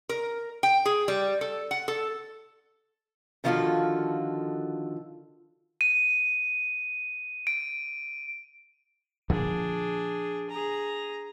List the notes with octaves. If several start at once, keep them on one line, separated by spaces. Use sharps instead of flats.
A#4
G5
G#4
G3
A4
F#5
A4
D3 D#3 F3 F4 F#4 A4
D#7
D7
A#2 D3 F3 D4 G#4
G#4 A#5